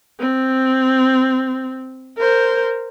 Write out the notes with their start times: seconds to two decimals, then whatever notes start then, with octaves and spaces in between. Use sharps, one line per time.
0.20 C4
2.18 A#4 C5